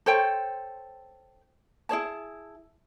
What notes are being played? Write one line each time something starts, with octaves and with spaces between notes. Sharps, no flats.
A4 C5 C#5 G5
E4 G#4 C#5 A5